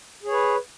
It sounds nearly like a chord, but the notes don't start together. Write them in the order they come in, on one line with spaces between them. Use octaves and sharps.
G#4 C#5 B4